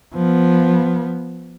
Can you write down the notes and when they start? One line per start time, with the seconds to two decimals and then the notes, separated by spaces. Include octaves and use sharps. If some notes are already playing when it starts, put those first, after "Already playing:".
0.14 F3 B3